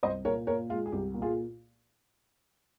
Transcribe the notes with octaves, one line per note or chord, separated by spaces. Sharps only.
C2 C5 D#5
A#2 A#4 C#5
A#2 A#4 C#5
G#3 F4
G#4
C2 G4
A#2
F4 G#4